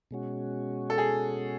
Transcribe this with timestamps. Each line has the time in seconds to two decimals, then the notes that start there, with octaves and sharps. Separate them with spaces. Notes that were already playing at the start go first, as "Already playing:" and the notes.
0.11 B2 G#3 C#4 F#4
0.90 A4
0.98 G#4